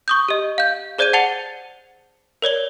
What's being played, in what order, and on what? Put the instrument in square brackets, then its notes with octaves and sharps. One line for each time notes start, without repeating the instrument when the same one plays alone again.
[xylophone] C#6 D#6 G6
G4 D#5
F5 G6
G#4 C5 D5 G6 G#6 D#7
F#5 A5 A6 C#7 F7 G7
A#4 C#5 D5 G7